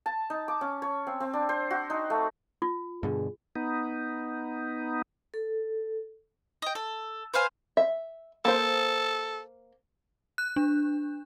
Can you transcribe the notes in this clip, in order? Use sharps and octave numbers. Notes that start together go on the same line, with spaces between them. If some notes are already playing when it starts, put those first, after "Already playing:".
A5
D#4
D6
C#4
C#5
C4
C4
D4
C5
F#4
D#4
A3
F4
G2 B2 D3 G#4
B3 D#4
A4
D#5 G5
A4
B4 C5 F5 G#5
E5
A#3 A4 C5
F#6
D4